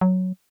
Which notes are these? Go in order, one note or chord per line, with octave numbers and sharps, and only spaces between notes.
F#3